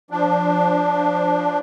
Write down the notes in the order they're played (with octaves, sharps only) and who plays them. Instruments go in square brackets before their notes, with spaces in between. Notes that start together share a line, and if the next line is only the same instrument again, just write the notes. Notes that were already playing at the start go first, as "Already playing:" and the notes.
[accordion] F3 D4